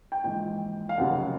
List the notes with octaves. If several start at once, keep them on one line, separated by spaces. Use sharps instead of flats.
G5
A#1 G#2 E3 G5
F5
F1 D#2 C#3 F#3 F#5